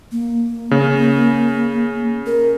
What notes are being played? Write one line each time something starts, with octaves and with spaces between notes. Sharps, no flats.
A#3
C#3
A#4